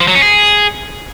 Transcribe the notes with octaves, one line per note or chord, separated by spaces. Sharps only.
F3
F#3
C#4
G#4